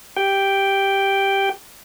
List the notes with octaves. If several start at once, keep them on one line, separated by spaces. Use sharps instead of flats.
G4 G5